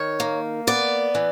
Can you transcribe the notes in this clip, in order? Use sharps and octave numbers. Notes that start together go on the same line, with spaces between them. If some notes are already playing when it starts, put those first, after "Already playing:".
Already playing: D#3 C#5
A#3
B3 D5
E3